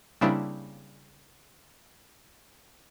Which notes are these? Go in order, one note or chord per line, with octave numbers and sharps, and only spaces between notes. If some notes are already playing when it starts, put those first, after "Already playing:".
C#3 G3 A#3 C4 D4 E4